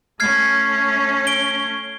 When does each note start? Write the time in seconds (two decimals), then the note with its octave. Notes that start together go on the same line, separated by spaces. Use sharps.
0.20 A3 C#4 F6 G#6 C7
1.27 D7 G7